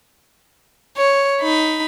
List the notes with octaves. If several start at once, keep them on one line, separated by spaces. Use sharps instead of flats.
C#5
D#4 B5